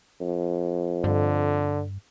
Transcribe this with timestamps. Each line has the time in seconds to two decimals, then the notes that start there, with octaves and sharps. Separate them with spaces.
0.21 F2
1.04 G2 D3